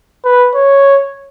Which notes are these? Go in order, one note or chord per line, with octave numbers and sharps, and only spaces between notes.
B4
C#5